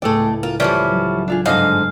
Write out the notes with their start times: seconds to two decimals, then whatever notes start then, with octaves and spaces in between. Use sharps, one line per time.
0.02 C#2 A2 A3 G#4 A4 D5 G5
0.43 F4 A#4
0.60 E3 F3 G3 C#4 B4 C5 D5
0.88 F#3 E7
1.28 D4 F4 G#4
1.46 G1 G#2 D3 G#3 D#4 D#5 F5